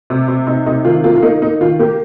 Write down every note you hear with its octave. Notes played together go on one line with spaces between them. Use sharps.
C3
C3
C3 D#4
C3 D#4
D#3 F4
A#3 F4
F4
A#3 D#4
A#3 D#4
D#3 F4
A#3 G4